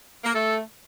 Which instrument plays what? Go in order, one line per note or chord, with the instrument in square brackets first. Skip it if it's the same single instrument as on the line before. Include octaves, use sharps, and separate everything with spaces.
[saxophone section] A#3
[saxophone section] A3 [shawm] A4